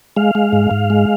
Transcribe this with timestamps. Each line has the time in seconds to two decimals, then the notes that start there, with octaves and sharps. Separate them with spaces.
0.16 G#3 F5
0.35 G#3
0.53 G#2
0.71 G#2
0.90 G#3